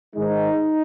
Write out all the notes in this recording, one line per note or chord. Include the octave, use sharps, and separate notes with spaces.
G#2 D#3 G#3 D#4